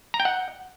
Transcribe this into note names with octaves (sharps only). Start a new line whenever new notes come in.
A#5
G5
F#5